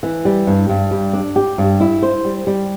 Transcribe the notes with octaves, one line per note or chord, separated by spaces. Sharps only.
E3
G3
G2
G2
G3
D4
G4
G2
E4
C5
G3
G3